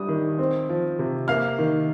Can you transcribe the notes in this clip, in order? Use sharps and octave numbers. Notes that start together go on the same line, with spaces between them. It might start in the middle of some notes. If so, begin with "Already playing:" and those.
Already playing: G3 D4 D#6
D#3
C4
F3
C3
A#3 F5 F6
D#3